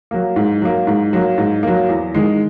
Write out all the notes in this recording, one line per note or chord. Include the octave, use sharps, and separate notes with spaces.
F#3 A#3
G#2
F#3 A#3
G#2
F#3 A#3
G#2
F#3 A#3
E2
D#3 G#3